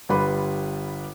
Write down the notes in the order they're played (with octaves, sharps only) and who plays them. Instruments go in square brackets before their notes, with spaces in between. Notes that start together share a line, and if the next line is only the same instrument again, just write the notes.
[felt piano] G1 G3 G4 B4 B5 C6